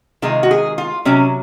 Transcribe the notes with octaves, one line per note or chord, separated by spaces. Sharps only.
C3 D#3 G#3 F4
F#4
G#4
F4
C3 F#3 C#4